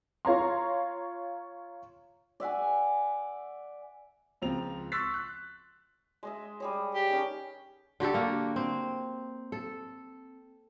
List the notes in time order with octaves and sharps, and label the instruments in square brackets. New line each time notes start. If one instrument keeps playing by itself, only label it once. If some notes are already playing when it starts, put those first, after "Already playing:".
[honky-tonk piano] F4 C#5 A#5 C6
[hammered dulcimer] D5 E5 F#5 G#5
[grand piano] C#2 F3 C4 A#5 F7
C6 C#6 E6 F#6 A6 B6
F#6
[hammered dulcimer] G#3 D#5 E5
G3 G#4 C#5
[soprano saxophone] G4
[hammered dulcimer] D#3 C#4
[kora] D3 F#4 G4 A4
A#3
C4
A4